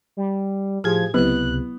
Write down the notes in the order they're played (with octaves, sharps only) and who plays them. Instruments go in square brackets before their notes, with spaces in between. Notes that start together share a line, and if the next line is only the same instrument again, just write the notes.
[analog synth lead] G3
[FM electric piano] A2 G#4 G#6 [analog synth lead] F3 [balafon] G4
[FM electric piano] C#2 C3 [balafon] F#3 E4 [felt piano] B3 [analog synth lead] F#6